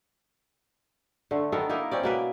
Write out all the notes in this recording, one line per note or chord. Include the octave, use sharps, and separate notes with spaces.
D3 A3
D#3 B3 A4 A#4
A#3 D#4 E4 A#4
C4 C#4 D5
B2 A#3 B4